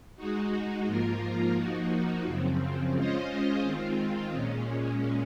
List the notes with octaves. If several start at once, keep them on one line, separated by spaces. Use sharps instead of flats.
G#3 D#4 F#4
G#2 F3 A#3 F4 A#4
F3 A#3 D#4 F#4
F#2 C#3 F3 C4
G#3 C#4 F4 C5 D#5
D#3 G#3 C4 F4
A#2 G#3 C#4